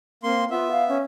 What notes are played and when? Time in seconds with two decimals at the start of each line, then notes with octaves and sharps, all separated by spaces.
0.23 A#3 C4 C6
0.51 B3 F4 E5
0.71 F5
0.89 C#4